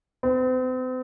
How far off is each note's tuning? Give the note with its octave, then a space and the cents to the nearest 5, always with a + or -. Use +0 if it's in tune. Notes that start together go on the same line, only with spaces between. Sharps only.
C4 -40